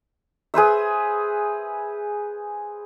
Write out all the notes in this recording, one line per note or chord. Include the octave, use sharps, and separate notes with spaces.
G#4 B4 C5 E5